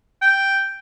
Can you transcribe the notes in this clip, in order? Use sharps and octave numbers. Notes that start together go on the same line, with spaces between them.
G5